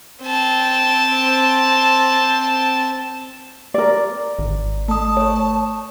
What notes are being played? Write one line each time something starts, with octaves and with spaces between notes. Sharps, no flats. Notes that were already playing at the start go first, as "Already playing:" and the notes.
C4 A5
A#4 D5
G#1
A3 A5 D#6
C#5